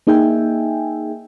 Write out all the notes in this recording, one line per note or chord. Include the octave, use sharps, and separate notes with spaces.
A#3 D#4 G#4 E5 G5 G#5